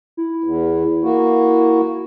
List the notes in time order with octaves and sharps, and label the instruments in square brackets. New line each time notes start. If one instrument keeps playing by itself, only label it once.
[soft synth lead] E4
[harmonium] E2
A#3 F#4